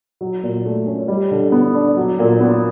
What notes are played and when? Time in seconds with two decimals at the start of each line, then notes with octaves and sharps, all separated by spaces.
0.21 F#3
0.43 A#2
0.66 A3
0.87 C#4
1.08 G3
1.31 D3
1.52 B3
1.74 D4
1.97 F#3
2.19 A#2
2.40 B3